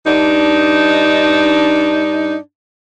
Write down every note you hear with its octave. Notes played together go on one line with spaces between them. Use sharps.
G2 D4 D#4